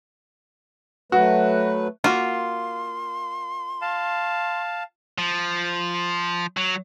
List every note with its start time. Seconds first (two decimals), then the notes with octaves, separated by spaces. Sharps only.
1.12 F#3 A3 F#4 B4
2.04 A#3 F4 F#4 C6
3.82 F5 A5
5.18 F3
6.57 F#3